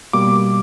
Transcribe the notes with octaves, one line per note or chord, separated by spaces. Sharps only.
B2 G3 A#3 D6